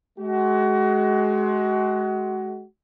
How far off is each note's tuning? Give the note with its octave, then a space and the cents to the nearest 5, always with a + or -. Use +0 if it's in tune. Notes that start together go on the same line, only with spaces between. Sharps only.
G#3 +30 F#4 +30